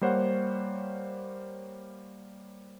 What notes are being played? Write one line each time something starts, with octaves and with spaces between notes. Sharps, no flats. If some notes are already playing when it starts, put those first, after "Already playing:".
G3 A#3 C5 C#5 F#5